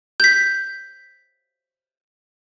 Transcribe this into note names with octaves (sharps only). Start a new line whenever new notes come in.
G6 B6